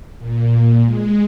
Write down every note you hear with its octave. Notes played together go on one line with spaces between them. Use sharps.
A#2
G#3